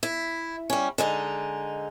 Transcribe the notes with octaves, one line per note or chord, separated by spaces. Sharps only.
E4
G3 C#4
D3 G#3 D#4